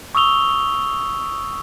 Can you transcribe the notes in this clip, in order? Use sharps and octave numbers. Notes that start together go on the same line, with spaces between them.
C#6 D#6 E6 F7 G7